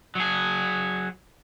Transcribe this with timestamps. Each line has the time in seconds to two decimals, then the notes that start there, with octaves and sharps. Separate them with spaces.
0.15 F#3 G#4